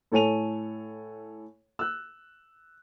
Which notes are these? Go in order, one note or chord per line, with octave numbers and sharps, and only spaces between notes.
A2 A4 C#5 G#5 D#7 F7
E6 F#6